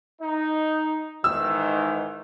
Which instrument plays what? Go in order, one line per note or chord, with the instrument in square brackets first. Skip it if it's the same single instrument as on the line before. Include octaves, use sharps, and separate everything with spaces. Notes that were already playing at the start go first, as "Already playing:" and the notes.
[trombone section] D#4
[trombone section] G#2 D#3 E3 [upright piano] E6